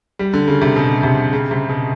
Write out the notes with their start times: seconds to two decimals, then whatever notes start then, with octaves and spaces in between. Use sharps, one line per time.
0.19 G3
0.34 D3
0.48 C#3
0.62 C3
0.76 B2
1.03 C3
1.33 C#3
1.51 C3
1.69 B2